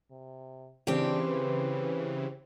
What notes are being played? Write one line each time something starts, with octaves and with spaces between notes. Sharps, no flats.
C3
C#3 E3 C4 D4 G4
B4